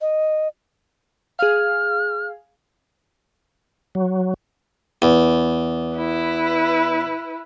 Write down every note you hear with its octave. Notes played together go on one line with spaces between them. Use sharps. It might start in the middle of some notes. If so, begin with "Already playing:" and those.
D#5
G#4 F5 F6
F#3
E2
E4 B4